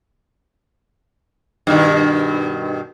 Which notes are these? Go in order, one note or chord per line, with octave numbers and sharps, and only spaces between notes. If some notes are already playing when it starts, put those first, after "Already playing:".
G2 B2 D#3